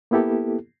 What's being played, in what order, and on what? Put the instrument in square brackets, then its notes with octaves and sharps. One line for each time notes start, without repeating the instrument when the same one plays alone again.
[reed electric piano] A#3 B3 E4 G4 A4